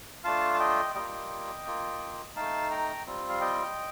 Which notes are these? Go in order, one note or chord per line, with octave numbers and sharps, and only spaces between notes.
A3 D4 F4 F5 A5
A5
D#5 G5
G3 A#3 F4 D#5 G5
A#3 F4
A3 D#4 F5 A5
G5 A#5
G3 C4 F4
F5
D#5 G5